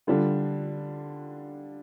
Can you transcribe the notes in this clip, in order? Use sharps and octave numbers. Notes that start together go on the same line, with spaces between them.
D3 G3 D4 F4